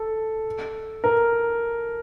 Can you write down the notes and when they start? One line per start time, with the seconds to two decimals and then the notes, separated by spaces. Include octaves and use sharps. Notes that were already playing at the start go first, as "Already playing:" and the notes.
Already playing: A4
1.04 A#4